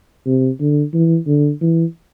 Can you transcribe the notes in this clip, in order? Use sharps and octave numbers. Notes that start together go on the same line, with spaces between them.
C3
D3
E3
D3
E3